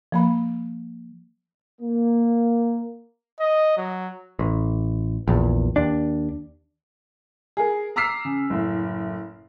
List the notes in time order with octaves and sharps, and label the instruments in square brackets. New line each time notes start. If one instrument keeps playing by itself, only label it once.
[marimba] F3 A#3 B5
[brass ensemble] A#3
[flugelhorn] D#5
F#3
[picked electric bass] A1
A#1 E2
D#2 D4
[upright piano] G#4 A#4
A#5 D6 E6 F6 B6 C7
C#3
F#1 A2